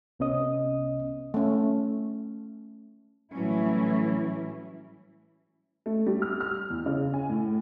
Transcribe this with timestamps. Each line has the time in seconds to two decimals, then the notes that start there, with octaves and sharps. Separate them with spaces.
0.19 C2 C3 B3 C#4 D#5 D#6
1.34 A3 C#4
3.32 A2 E3 F#3 G3 C#4 E4
5.86 A3
6.06 G3
6.22 F6
6.41 F6
6.70 E2
6.86 C#3
7.14 G#5
7.29 A2